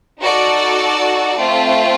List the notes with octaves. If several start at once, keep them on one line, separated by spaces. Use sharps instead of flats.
D#4 F#4 A4 D5
A3 C4 F4